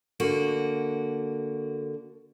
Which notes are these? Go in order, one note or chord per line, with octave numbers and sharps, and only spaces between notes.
D3 A#3 F#4